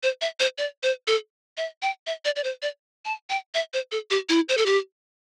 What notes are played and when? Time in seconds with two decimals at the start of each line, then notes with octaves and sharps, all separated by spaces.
0.03 C5
0.21 E5
0.40 C5
0.58 D5
0.83 C5
1.07 A4
1.57 E5
1.82 G5
2.07 E5
2.25 D5
2.36 D5
2.44 C5
2.62 D5
3.05 A5
3.30 G5
3.54 E5
3.73 C5
3.92 A4
4.11 G4
4.29 E4
4.49 C5
4.57 A4
4.66 G4